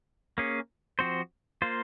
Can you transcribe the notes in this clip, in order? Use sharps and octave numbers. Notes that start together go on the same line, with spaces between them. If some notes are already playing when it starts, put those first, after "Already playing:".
A#3 C#4 G#4
F3 C4 F#4 C5
A#3 F4 C5